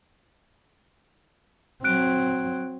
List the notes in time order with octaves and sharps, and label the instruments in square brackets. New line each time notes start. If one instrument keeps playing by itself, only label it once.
[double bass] F#3 C4 [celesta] F#6 D7